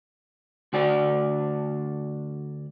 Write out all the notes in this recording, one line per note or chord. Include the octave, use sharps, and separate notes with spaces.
D2 F#4 D5